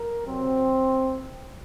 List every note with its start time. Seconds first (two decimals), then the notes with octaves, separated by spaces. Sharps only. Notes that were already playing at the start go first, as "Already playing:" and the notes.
Already playing: A#4
0.24 C3 F#3 C4